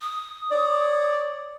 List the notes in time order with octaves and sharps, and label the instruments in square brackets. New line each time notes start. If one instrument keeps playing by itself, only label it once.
[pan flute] D#6
[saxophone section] C#5 D5